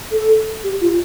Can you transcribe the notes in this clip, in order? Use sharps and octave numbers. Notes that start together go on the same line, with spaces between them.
A4
G4
F4